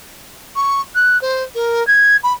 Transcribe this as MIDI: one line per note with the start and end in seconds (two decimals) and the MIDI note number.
0.56 0.81 85
0.95 1.20 90
1.21 1.43 72
1.55 1.85 70
1.87 2.16 92
2.23 2.33 83